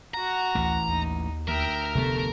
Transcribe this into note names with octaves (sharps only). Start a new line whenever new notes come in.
F#4 F#5 A#5
A1 D2 E3
D#2 D#4
D2 A#4 E5 G5
F1 D2 C3 A3 B3 A4